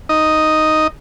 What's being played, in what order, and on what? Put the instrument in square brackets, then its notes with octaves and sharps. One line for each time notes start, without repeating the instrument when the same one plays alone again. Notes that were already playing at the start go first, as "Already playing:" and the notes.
[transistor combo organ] D#4 D#5